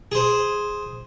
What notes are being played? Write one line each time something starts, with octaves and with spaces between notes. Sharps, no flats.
G#4 C5